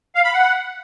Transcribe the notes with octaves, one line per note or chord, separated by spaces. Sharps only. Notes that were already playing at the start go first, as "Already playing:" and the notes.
F5
B5
F#5